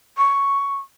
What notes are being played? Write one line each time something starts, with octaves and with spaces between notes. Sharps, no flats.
C#6